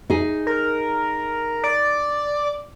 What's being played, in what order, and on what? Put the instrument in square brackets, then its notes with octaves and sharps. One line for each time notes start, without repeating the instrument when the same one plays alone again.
[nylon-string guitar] D#4 G#4
[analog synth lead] A#4
D5